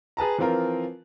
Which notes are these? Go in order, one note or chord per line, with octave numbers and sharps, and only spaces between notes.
G#4 B4 A5 A#5
E3 F3 C4 F4 A#4